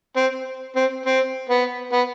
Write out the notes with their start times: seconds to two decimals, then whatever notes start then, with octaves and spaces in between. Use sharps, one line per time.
0.17 C4
0.76 C4
1.06 C4
1.49 B3
1.93 B3